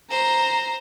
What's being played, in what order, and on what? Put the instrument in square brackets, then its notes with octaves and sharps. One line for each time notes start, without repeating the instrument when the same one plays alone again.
[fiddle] C5 [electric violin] A#5